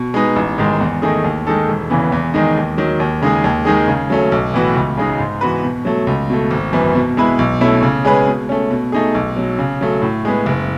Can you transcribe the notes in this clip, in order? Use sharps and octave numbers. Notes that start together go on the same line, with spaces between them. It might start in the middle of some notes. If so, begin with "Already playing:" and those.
Already playing: B2
G#3 B3 D#4
A1
G#2 D#3 G#3
E2
D#3 A3 D#4 G#4
D#2
D#3 G#3 D#4 A4
E1
E2 C#3 E3 B3
E2
D#3 G#3 D#4
D#2
D#3 F#3
D#2
C#3 G#3 D#4 G#4
D#2
D#3 G#3 D#4 G#4
C#3
F#3 A3 C#4
B1
A2 E3 B3 F#4
C#2
C#3 G#3 D#4
G#2
E3 B3 F#4 B4
B2
F#3 A3
C#2
B2 A3
G#1
F#2 E3 B3
B2
G#3 B3 E4 B4
B1
B2 A3 C#4 E4
C#3
G#3 C#4 G#4 B4
B2
A3 C#4
B2
A3 D#4 G#4
B1
B2 F#3
C#3
F#3 A3
A2
G#3 B3
F#1